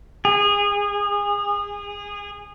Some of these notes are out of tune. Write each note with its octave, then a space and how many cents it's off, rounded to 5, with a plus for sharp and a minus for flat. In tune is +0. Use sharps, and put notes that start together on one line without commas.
G#4 -25